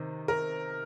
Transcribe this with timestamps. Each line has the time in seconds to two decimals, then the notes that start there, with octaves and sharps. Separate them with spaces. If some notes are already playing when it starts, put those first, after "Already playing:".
Already playing: C3 D#3
0.28 A#4